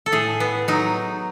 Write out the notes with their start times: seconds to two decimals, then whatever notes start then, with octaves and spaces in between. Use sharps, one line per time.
0.06 A4
0.12 A2 G#4
0.40 B3
0.68 F#3 D#4